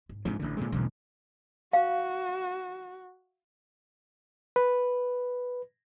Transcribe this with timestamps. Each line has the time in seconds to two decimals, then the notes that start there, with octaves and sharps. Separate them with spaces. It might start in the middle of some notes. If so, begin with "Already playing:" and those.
0.09 G#2
0.25 G#2 C3 F3 D4
0.39 A1 D3
0.57 A#2 D3 G#3
0.72 A1 E2 B2 D3 G3
1.73 F#4 F5
4.56 B4